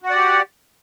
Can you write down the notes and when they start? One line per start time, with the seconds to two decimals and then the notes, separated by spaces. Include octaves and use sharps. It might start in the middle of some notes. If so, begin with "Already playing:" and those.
0.02 F#4
0.06 F#5
0.10 D5
0.15 G4